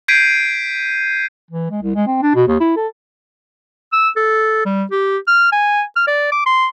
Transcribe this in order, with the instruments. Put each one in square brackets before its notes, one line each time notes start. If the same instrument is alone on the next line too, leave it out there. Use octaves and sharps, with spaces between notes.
[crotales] G6 G#6 B6 C7 D7 D#7
[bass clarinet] E3
G#3
C2
G#3
C4
D4
B2
D#2
E4
A4
[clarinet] E6
A4
G3
G4
F6
G#5
F6
D5
D6
C6